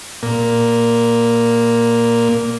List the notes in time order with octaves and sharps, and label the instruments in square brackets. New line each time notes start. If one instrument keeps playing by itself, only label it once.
[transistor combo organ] A#2 A#3